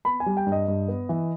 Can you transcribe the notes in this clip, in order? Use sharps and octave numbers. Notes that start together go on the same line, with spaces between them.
B3 B5
G#5
G3
G5
G2
D#5
G2
B3
E3